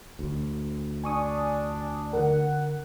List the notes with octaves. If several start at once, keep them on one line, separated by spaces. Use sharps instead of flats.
D2
D4 G#5 C#6 D#6
D3 A#4 F#5